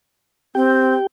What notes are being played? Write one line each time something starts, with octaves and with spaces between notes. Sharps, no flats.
C4 G4 G5